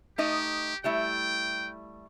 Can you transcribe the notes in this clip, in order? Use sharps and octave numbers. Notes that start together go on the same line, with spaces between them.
A3 D#4 G4 D#5
G3 A3 E4 G5